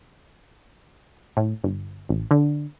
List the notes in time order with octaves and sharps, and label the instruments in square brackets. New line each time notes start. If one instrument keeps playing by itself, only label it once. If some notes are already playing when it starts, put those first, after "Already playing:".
[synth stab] A2
G1
A1
D3